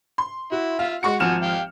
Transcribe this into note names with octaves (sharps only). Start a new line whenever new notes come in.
C6
E4 F#4
F4 E5 F5
G#3 F#4 C#6 C#7
G#1 F3 F#4 G#5 F6 E7
G4 F5 G5